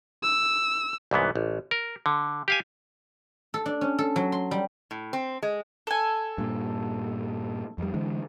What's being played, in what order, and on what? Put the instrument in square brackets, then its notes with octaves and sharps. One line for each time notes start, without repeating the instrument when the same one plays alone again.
[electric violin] E6
[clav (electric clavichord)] C2 G#2 E3 B3
A1
A#4
D3
G4 F5 G#5
[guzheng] A4
D4
C#4
A4
F#3
C6
G3
[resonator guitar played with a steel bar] A2
C4
G#3
[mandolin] A4 G#5
[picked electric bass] G2 A#2
F2 G3
D3 E3 G#3